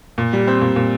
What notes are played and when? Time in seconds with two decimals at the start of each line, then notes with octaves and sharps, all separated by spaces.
0.18 A#2
0.33 G3
0.47 C4
0.62 A#2
0.76 A#2